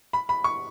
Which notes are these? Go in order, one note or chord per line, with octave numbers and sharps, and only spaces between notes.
B5
B5
C#6